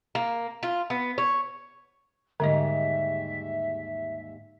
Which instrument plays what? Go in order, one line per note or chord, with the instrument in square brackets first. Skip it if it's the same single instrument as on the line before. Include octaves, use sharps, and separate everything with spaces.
[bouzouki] A#3
F4
B3
C#5
[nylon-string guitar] D#2 G#2 G3 [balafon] D3 D#5 [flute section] E5